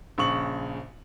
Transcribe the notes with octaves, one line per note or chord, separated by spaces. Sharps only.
A#1 C#3 C#6 F#7